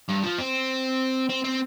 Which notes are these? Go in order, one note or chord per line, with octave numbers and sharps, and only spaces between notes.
G2
F3
C4
C4
C4